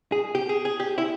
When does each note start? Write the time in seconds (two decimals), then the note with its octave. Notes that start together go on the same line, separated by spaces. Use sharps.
0.12 G#4
0.35 G4
0.49 G#4
0.65 G#4
0.80 G4
0.98 E4